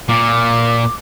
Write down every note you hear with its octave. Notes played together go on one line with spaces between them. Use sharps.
A#2 D6